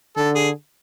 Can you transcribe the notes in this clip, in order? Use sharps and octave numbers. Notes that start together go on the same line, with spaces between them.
D3 A4
G#4